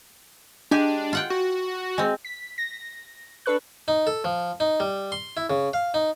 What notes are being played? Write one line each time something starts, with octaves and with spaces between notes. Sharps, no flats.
G#3 D4 G4 G#5
F4 F#5 G5
F#4
G#3 C4
B6
A#6
D4 A4 B4 C#6 F#6
D#4
A4
F3
D#4
G3
C6
E4
C#3
F5
D#4